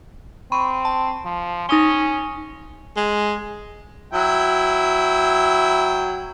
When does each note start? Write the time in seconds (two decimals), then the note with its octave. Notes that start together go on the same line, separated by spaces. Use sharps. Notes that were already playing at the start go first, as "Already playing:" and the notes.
0.52 C4 B5 C#6 D#7
0.85 A5
1.25 F3
1.69 C#4 D#4 D#6 G7
2.97 G#3
4.13 F#3 E4 G5